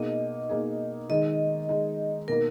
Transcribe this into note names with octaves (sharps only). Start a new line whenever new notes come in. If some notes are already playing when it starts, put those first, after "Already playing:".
Already playing: B2 A#3 D#4 G#4 D#5
B2 A#3 D#4 G#4
D#3 G#3 D#4 G#4 D#5
D#3 G#3 D#4 G#4
B2 A#3 D#4 A#4